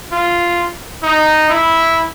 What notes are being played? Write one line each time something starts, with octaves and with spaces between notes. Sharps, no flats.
F4
D#4
E4